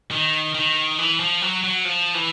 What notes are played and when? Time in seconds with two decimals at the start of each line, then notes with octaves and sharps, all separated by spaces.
0.11 D#3
0.55 D#3
0.98 E3
1.20 F3
1.42 F#3
1.64 F#3
1.85 F3
2.14 E3